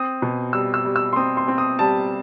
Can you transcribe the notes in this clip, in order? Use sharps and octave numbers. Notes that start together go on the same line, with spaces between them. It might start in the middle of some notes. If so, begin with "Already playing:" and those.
Already playing: C4 D#6
B2
G3 E6
E6
G3
E6
C6
C4 D#6
C6
C4
D#6
G3 A5